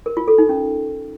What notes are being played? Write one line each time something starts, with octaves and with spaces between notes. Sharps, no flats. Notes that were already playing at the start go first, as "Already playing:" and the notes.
A#4
F4
A4
D#4
C#4